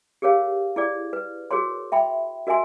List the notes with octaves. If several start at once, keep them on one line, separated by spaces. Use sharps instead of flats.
G4 G#4 A#4 C#5 F5
E4 G#4 D5
B4
F#4 G#4 A#4 C#5 C6
E5 G5 B5
F#4 A#4 D#5 E5 G#5 C6